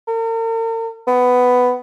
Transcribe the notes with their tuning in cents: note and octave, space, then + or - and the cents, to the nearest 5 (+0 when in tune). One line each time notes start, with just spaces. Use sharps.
A#4 -45
B3 +10